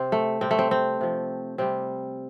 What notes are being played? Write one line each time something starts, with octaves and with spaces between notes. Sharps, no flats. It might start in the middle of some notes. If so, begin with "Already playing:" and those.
Already playing: C3 C4
A3
C3 G3 C4
A3
C4
C4
C3 F3
C3 G3 C4